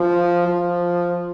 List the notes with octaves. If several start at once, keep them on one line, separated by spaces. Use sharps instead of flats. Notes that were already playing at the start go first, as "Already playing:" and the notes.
Already playing: F3
F3